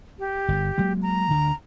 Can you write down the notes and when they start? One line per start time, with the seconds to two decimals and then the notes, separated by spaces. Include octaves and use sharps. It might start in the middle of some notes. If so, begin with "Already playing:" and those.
0.19 G4
0.48 G1
0.78 F#3 G#3 A#3
1.02 A#5
1.30 D2 D3